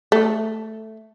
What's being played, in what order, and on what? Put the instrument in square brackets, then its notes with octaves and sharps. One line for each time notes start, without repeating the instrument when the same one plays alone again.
[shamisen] A3